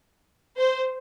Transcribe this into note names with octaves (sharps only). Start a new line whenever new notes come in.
C5